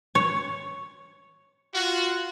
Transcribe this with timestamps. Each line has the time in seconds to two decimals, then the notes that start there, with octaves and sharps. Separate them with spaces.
0.15 C#5
1.73 F4 F#4